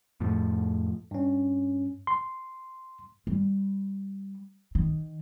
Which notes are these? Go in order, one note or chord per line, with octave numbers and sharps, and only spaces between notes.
F2 A2 F3
G2 C#4
C6
G3
D#3